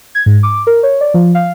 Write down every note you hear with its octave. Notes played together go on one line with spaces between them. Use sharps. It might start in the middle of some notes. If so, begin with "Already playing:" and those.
G#6
G#2
D6
A#4
C#5
D5
F3
F5